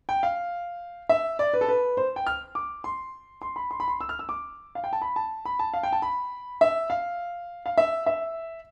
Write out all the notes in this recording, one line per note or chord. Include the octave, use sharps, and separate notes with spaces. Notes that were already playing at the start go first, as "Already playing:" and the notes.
G5
F5
E5
D5
B4
A4
B4
C5
G5
F6
D6
C6
C6
B5
C6
B5
C6
E6
F6
E6
D6
F5
G5
A5
B5
A5
B5
A5
F5
G5
A5
B5
E5
F5
F5
E5
E5